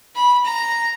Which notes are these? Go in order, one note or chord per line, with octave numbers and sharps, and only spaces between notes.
B5
A#5